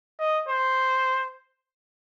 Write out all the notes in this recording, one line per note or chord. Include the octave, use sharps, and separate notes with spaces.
D#5
C5